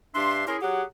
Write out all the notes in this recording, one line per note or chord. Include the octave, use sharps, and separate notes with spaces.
G2 D4 G4 E5 C6
C#4 E4 G#4 A#4 C6
F#3 G4 G#4 F#5